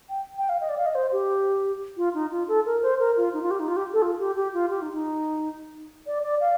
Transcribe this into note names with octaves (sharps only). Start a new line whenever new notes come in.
G5
G5
F5
D#5
D5
F5
D#5
C5
G4
F4
D#4
F4
A4
A#4
C5
A#4
F4
D#4
F4
G4
D#4
F4
G4
A4
F4
G4
G4
F4
G4
D#4
D#4
D5
D5
F5